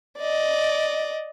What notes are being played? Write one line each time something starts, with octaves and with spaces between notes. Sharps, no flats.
D5 D#5